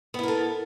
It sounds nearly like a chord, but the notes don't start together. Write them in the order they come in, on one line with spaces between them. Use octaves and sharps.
B3 E4 A#4 A4